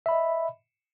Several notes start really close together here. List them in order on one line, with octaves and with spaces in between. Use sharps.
E5 B5 D#5